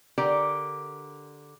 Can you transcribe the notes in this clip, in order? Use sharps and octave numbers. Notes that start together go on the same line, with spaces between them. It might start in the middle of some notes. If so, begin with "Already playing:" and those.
D3 G4 A#4 D5